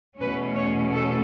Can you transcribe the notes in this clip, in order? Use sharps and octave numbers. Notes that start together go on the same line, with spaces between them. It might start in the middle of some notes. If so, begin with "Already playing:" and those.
E2 B2 A3 C#4 B4
C#5
A4